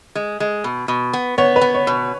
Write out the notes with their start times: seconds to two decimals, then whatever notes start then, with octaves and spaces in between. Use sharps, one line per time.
0.15 G#3
0.40 G#3
0.64 B2
0.88 B2
1.13 B3
1.38 B3 C#5
1.56 B4
1.61 B3
1.74 C#5
1.87 B2